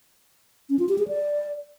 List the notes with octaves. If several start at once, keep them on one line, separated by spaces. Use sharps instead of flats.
C#4
F4
G4
G#4
D5